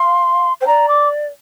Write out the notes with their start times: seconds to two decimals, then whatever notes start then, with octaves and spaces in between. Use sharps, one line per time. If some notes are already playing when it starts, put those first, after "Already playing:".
Already playing: F5 C6
0.61 C5 G5
0.66 D5 A#5
0.88 D6